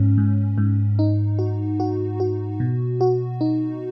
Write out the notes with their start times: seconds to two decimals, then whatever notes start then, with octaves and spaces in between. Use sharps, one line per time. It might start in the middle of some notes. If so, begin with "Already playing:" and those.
Already playing: G#2 C#4
0.18 G#2
0.58 G#2
0.99 D#4
1.39 F#4
1.80 F#4
2.20 F#4
2.60 B2
3.01 F#4
3.41 D#4